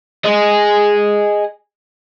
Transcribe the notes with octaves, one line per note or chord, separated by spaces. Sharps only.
G#4 D#5